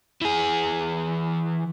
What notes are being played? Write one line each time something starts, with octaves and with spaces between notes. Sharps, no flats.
E3 G#4